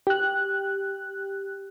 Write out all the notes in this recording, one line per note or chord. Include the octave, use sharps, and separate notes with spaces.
G4 F#6